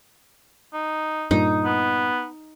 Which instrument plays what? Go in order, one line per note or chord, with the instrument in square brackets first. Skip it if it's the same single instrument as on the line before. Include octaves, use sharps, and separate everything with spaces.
[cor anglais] D#4
[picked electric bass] G2 A#2 [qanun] D#4
[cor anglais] B3